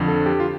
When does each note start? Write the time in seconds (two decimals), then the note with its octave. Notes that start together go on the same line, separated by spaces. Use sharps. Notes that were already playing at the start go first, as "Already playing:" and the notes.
Already playing: F2 D3 F3
0.08 A4
0.26 G4
0.40 F4